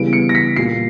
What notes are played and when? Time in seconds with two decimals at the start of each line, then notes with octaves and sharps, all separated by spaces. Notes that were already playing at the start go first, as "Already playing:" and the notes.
Already playing: C#3 E3 G3 B3 D7
0.13 C#7
0.29 A#6
0.35 B6
0.56 A#2 G3 A#3 C7